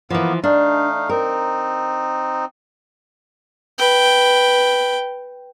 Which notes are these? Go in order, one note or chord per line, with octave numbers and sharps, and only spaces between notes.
E3 F3 A#3 B3
A3 D4 D#4 F5
C4 D#4 A#4
B4 G5